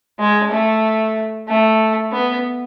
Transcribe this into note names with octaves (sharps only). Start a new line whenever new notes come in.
G#3
A3
A3
B3